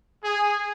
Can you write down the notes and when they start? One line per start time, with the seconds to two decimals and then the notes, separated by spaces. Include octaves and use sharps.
0.24 G#4